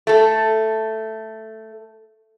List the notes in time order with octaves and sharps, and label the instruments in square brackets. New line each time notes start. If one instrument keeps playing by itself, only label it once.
[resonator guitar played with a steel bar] A3 A4